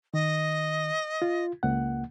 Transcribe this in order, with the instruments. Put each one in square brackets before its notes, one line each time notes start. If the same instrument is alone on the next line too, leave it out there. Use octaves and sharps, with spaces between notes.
[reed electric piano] D#3 [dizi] D#5
[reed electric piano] F4
C#2 A#3 F#5